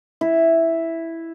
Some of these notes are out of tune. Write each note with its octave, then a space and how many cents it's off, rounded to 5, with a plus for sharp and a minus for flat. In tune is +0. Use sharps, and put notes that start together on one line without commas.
E4 +0